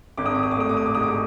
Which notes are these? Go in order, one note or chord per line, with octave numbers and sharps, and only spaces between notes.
G#1 D6
D#6
D6
D#6
D6
A3 D#6
D6
D#6
D6
G#2 D#6
D6